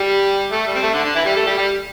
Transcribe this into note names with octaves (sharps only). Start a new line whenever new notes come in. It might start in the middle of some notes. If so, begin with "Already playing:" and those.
Already playing: G3 G4
A3
G3
C4
A3
D3 D4
D3 D4
E3 E4
G3 G4
A3 A4
G3 G4
G3 G4